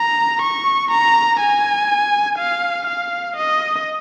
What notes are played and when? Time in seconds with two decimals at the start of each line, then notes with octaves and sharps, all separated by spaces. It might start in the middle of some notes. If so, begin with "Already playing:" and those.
Already playing: A#5
0.42 C#6
0.91 A#5
1.40 G#5
2.38 F5
2.87 F5
3.37 D#5